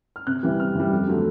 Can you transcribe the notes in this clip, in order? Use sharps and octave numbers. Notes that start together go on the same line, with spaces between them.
F6
C3 F#6
E3 G3
C3 F6
E3 G3
F2
D3 F#3 A3